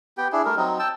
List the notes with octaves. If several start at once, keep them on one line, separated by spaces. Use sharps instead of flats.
B3 G4 G5
D4 E4 G#4
G3 A3 A#4
F#3 C4 D#4
G5 A5 E6